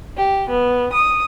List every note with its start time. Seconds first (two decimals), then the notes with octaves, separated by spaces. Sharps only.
0.17 G4
0.50 B3
0.93 D#6